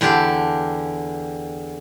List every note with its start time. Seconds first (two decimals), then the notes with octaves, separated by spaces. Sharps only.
0.01 E2 D3 G4 A5